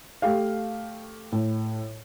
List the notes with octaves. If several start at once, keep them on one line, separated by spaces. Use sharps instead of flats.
A3 G4 F5
A2